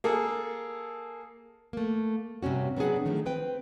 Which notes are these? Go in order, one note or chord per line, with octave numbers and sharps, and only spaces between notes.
A#3 G#4 A4
A3 A#3
G2 C3 G3 C#4 F#4
F#3 B3 C4 D4 G#4 F#5
D#3 F3 A3
C4 B4 G5